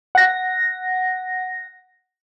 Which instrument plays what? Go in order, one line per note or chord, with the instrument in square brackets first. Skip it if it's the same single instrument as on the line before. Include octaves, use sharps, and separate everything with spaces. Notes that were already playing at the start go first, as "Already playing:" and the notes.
[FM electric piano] F#5 A#6